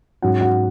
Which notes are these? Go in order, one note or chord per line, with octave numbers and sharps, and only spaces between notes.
G#2 F#3 C#4 F#4 F#5
F#4 F#5